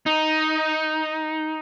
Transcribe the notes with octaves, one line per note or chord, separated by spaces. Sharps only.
D#4